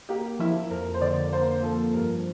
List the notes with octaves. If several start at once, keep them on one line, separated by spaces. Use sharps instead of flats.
A#3 G4
F3 E4
F2 A#4
C5
D3 D5
A#3 C5
F3 A4
G2 A#4